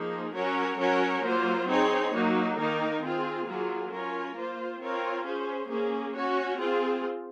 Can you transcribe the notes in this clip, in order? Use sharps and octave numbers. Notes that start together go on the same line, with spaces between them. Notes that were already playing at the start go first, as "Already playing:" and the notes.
Already playing: F3 A#3 D#4 G#4
F#3 C#4 F#4 A#4 C#5
F#3 C#4 F#4 A#4 C#5
F#3 A#3 F4 C5
C4 D#4 G#4 C#5
F#3 A#3 D#4 F#4
D#3 A#3 D#4 A#4
C4 F4 G#4
F#3 A#3 F4 G#4
C#4 F4 A#4 C#5
A#3 F4 C5
C4 F4 A#4 C#5
C#4 G#4 C5
A#3 C#4 G#4
C#4 F#4 C#5
C4 F4 G#4